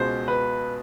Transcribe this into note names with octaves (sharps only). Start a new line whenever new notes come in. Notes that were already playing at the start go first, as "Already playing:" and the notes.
Already playing: C#2 B2 G#3 C5
B4